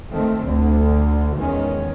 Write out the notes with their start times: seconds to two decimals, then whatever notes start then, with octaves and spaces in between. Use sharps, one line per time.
0.10 D#3 A3 C4
0.46 D2 D3
1.37 E2 D#3 G#3 C#4